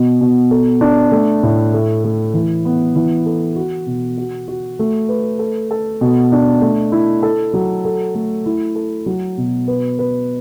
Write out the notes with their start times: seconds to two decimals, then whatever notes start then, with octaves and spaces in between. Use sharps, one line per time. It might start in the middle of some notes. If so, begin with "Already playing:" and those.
Already playing: B2
0.21 B2
0.51 A4
0.81 D4
1.12 A3
1.43 A2
1.73 A3
2.04 A3
2.34 E3
2.65 B3
2.95 E3
3.26 A4
3.56 F#4
3.86 B2
4.17 F#4
4.48 F#4
4.79 A3
5.09 B4
5.39 A4
5.71 A4
6.01 B2
6.32 D4
6.62 A3
6.92 E4
7.23 A4
7.54 F#3
7.85 A4
8.15 A3
8.46 E4
8.75 A4
9.06 F#3
9.37 B2
9.68 B4
9.99 B4